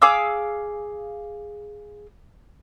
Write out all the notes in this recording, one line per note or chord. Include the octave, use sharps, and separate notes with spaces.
G#4 F5 D6 E6